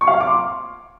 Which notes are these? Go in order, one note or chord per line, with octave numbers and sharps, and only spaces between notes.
C#6
F5
F6
D6
C6